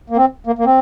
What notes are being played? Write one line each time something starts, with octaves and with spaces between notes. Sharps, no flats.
A#3
C4
A#3
A#3
C4